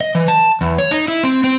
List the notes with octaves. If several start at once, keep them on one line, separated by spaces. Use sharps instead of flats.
D#5
E3
A5
E2
C#5
D#4
E4
C4
C4